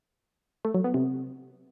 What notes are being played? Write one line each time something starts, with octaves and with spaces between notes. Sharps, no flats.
A3
F#3
B3
C3